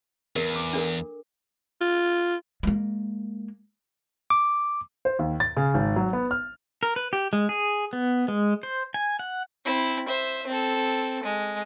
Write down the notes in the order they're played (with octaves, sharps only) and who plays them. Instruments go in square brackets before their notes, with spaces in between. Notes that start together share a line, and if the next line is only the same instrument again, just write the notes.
[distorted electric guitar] E2 [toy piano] A#4
[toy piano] D6
D4 A4 A#4
[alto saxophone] F4
[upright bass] G#3 A#3
[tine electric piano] D6
[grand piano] C5
D#2
A6
C#3
G#1
F#3
B3
F6
[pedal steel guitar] A#4
B4
G4
G#3
G#4
B3
G#3
C5
G#5
F#5
[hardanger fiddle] C4 E4
C5 E5
C4 A4
G#3